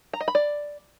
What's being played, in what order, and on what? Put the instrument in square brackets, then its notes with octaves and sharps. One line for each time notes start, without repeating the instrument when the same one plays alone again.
[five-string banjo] A#5
D#5
B5
D5